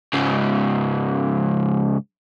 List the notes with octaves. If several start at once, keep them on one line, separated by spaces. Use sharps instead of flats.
G#2 C#3